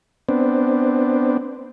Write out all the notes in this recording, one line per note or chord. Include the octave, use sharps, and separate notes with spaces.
B3 C4 D4